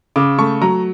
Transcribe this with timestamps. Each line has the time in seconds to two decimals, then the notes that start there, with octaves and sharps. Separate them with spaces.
0.16 C#3 D6
0.38 A3 C#6
0.61 F#3 A#5